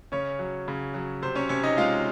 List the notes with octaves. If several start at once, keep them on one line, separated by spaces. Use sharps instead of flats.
C#3 C#4 C#5
F#3
C#3
F#3
C3 C5
C#4 C#5
C3 C#4 C#5
D#4 D#5
G#3 F4 F5